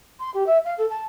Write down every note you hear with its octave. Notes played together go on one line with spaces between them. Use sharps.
C6
G4
E5
F5
A4
A5